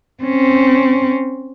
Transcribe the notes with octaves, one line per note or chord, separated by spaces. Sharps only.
C4 C#4